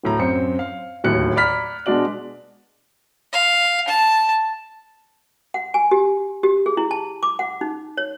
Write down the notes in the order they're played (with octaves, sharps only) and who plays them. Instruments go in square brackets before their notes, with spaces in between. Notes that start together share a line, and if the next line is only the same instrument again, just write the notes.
[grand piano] D1 A2 A#5
F#2 C4 C5 C#7
F5
D1 D#2 A2 F#6 C#7
D5 A#5 B5 F6 B6
B2 G#3 D4 F#4 D5 F#7
[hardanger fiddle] F5
A5
[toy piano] F#5
G#5
G4
G4
G#4
E4
A5
D6
F#5
D#4
C#5